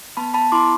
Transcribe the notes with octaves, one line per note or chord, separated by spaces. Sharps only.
B3 A5 B5
A5 B5
E4 C6 D6